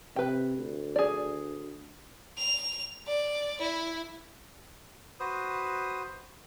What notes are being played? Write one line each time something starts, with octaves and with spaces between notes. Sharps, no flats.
C3 B4 G5
D2
G#4 D5
F7
D5
E4
F#4 B4 C5 D#6